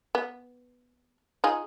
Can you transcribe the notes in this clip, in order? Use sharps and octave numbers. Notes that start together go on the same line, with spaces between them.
B3
D#4 F4 G#4